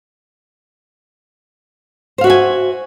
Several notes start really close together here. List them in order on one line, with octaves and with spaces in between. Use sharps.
C5 F5 F#4 E5 G#5